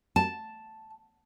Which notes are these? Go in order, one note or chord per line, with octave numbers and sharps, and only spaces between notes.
A5